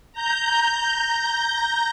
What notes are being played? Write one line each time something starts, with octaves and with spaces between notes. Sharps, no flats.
A#5 G6